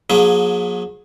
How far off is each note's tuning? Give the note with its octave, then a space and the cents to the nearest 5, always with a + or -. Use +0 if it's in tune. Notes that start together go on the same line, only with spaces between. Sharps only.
F#3 -40 A#3 +35 G#4 +0